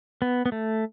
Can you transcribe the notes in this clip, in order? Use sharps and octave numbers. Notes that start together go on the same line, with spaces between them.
B3
B3
A3